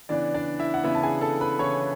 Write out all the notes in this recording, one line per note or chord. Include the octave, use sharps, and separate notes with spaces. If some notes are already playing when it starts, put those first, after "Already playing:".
C#3 E3 B3 D4 D5
D4 D5
E4 E5
F#5
C#3 E3 B3 E4 E5
A5
G#4 G#5
A4 A5
B4 B5
C#3 E3 B3 C#5 C#6